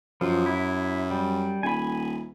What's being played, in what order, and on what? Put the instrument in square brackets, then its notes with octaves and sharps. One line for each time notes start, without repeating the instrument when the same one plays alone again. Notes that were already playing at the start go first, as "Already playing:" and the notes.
[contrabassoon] F#2 [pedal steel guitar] F3
[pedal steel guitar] E4
G3
[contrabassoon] D#1 [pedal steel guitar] G#5 B5